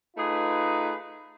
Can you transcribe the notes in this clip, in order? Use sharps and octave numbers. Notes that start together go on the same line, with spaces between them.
A3 D#4 F4 G#4 B4